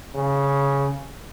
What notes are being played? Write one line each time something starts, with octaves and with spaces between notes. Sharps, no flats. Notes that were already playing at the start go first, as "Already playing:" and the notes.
C#3